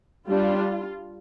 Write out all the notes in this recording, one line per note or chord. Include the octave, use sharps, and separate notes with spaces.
G3 D4 F4